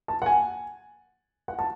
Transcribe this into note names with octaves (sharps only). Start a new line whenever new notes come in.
A5
F#5
G#5
F#5
A5